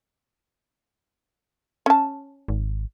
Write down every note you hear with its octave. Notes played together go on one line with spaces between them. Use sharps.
C#4 A5
G#1